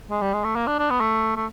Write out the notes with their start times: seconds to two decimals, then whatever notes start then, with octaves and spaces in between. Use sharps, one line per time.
0.10 G#3
0.21 G3
0.33 G#3
0.44 A3
0.55 A#3
0.67 D4
0.79 D4
0.90 B3
1.00 A3
1.36 A3